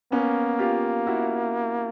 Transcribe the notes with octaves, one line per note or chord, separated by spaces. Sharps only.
A#3 B3 C#4
F4 G4
E4 F#4